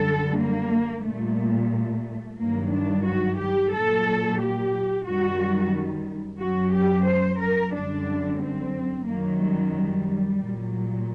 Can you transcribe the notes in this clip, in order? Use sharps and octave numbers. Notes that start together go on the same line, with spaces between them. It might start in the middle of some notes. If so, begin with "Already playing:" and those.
Already playing: F#2 D3 G3 A4
A#3
A#2 G3 A3
A3
G2 D#3 F#3 A#3
D4
F#4
G4
A#2 F#3 A4
G4
F#2 D#3 G3 F#4
F#2 F#3 F#4
G4
C5
A#4
F#2 D3 G3 D4
C4
F#2 D#3 F#3 A#3
G3
G3
A#2 F#3